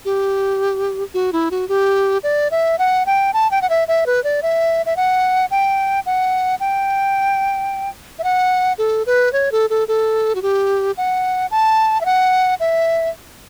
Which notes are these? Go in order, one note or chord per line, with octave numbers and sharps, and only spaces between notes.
G4
F#4
E4
F#4
G4
D5
E5
F#5
G5
A5
G5
F#5
E5
E5
B4
D5
E5
E5
F#5
G5
F#5
G5
E5
F#5
A4
B4
C#5
A4
A4
A4
F#4
G4
F#5
A5
E5
F#5
E5